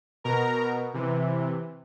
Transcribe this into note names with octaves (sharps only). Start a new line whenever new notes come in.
B2 A#4 A#5
C3 E3